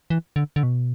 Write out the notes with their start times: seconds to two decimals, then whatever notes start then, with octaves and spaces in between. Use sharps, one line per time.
0.10 E3
0.36 D3
0.56 D3
0.63 B2